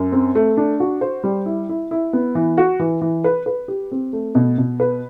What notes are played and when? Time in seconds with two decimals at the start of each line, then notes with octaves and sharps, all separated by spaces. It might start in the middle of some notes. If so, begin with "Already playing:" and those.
Already playing: F#2
0.12 C4
0.35 A3
0.57 D4
0.80 F#4
1.01 C5
1.24 G3
1.46 E4
1.69 E4
1.91 E4
2.13 B3
2.35 E3
2.58 F#4
2.80 E3
3.01 E3
3.24 B4
3.46 B4
3.68 G4
3.91 C4
4.13 A3
4.35 B2
4.58 B2
4.80 B4